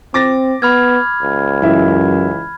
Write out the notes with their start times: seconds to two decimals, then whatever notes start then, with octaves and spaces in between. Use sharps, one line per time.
0.14 C4 D6 A6 A#6
0.62 B3 B5 F6 G#6
1.23 C#2
1.62 F#2 E3 E5